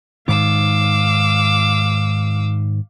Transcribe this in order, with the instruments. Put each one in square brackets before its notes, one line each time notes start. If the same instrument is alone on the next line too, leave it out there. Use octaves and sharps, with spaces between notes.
[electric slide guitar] G#2 D#3 [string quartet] F5 D6 E6